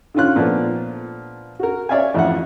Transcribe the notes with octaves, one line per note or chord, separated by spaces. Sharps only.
D3 D#3 C#4 F4 F#6
A#2 F3 A3 B3 D4
F#4 A#4
C#5 D5 E5 F5 G#5
A1 F2 F4 E5 F#5